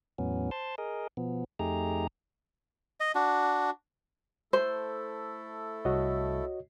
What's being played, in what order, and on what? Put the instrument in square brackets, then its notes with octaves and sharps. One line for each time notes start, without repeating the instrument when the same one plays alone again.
[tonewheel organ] E2 A2 F#3 B3 C#4
C5 A5 C6
G#4 A#4 D#5
B2 F3 B3
F2 A3 D#4 G4 G#4 A#5
[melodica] D#5
D4 F#4
[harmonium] A3 E4 A4 [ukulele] C5
[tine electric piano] C2 [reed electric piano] F#4 C#5 D#5